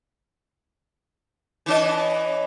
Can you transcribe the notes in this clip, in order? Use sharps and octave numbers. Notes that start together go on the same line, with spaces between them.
E3 C#4 D#5